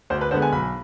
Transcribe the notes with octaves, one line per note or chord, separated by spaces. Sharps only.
D2 C5
B4
D3 G#3 B3 C5
G#5
B1 B5